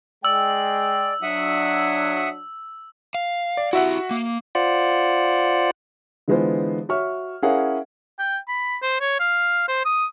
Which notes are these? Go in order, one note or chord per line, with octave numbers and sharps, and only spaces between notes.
G#3 D5 G5 E6
F#3 D4 E5 F#5 D#6
F5
D5
E4 F#4 G4 E5 F#5
A#3
F4 C5 D5 F#5
D3 E3 G#3 B3 F4 C5
F#4 C#5 E5 C#6 F6
C#4 E4 G#4 A#4 F5 F#5
G5
B5
C5
C#5
F5
C5
D#6